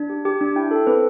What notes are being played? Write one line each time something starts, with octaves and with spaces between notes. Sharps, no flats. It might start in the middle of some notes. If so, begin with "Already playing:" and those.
Already playing: D4
G4
G4
D4
E4 G5
A4
C4 B4